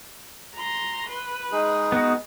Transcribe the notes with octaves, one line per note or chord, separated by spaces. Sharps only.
A#5 C6
B4
G#3 D#4 G#4
B3 F#4